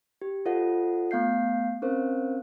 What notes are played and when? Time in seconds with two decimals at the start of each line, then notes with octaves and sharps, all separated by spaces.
0.22 G4
0.46 F4 A4 C5 D#5 F#5
1.11 A3 B3 F5 G6 C7
1.82 C4 C#4 A#4 C5 F5